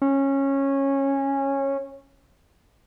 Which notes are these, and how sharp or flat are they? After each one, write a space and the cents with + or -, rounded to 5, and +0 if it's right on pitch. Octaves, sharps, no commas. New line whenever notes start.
C#4 -15